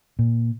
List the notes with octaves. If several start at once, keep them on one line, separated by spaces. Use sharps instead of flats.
A#2